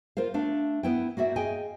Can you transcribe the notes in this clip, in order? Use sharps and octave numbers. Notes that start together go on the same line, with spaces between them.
F4 A#4 C5 F5
A3 D4 F5
B3 E4 G5
A#3 F#4 D5 E5
G#4 D#5 F5 G5 G#5